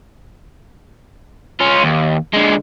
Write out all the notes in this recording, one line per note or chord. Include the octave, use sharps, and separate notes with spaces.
C#4 F4
D#2
D3 G#3